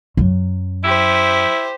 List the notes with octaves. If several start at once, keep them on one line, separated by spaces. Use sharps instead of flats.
F#2 F#3
E4 G4 C5